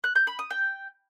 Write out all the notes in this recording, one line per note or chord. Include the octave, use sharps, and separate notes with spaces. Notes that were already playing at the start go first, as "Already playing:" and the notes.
F#6
G6
B5
D#6
G5